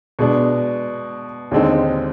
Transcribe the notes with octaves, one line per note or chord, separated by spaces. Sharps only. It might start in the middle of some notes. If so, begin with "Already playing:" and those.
B2 G#3 D4
D#2 D3 G#3 C4 D#4